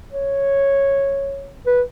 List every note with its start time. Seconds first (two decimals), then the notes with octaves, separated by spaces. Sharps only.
0.11 C#5
1.66 B4